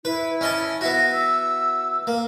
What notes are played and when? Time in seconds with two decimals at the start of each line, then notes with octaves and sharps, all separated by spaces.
0.05 E4 B4
0.41 C#4 D#5 A5
0.81 B3 E4 F#4 A#6
1.12 E6
2.07 A#3